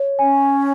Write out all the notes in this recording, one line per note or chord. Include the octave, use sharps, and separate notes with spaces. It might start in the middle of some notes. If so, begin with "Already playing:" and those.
Already playing: C#5
C#4 G#5